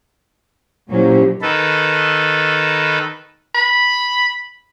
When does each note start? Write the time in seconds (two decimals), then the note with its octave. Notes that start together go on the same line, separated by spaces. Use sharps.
0.91 A#2 F#3 C#4 E4 G4 C5
1.42 D#3 A4 B4
3.55 B5